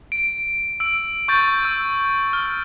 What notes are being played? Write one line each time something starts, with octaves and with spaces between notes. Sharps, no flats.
D7
E6 D7
C#6 G6 A6
E6
F6